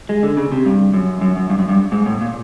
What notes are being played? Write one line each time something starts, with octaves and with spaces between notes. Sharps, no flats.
G#3
D3
C#3
C3
G2
F#2
F#2
F#2
G2
F#2
G2
G#2
A2
A#2